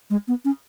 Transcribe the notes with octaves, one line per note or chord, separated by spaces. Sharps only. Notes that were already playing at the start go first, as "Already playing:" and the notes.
G#3
B3
C#4